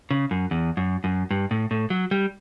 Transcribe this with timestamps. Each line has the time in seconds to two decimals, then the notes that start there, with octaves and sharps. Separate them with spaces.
0.11 C#3
0.31 F#2
0.51 E2
0.77 F#2
1.04 F#2
1.31 G2
1.51 A2
1.71 A2
1.90 F#3
2.11 G3